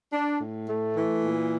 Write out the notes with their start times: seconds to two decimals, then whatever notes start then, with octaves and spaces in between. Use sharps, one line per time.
0.13 D4
0.39 A2
0.68 A3
0.96 E3
1.23 A#2